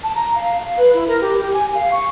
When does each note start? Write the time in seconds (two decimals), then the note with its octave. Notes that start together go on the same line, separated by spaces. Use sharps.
0.03 A5
0.15 A#5
0.35 F5
0.59 F5
0.77 B4
0.94 E4
1.07 A#4
1.21 G4
1.40 G4
1.54 G#5
1.75 F5
1.91 C#6